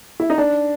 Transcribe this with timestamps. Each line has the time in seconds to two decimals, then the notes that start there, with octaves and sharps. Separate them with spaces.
0.20 E4
0.30 D#4
0.38 D4